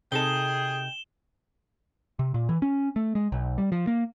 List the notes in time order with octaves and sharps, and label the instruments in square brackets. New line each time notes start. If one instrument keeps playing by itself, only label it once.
[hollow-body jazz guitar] C3 D#4 A4 [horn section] G#4 [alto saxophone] G5 [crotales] E7 G7
[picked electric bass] C3
A#2
E3
C#4
A3
G#3
B1
G3
F3
A#3